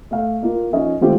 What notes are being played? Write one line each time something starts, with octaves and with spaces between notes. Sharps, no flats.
A3 F5
A#3 F4
F3 C#4 D#4 D#5
D#3 G#3 A3 C4 F4 G4